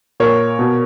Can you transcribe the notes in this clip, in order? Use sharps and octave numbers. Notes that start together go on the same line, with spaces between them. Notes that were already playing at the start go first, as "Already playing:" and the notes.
A#2 A#4 C#5
B2